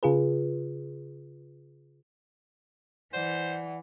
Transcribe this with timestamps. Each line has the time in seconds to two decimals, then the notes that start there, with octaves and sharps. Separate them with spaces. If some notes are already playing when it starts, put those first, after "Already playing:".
0.03 C#3 F4 G#4 B4
3.13 E3 C5 D5 F#5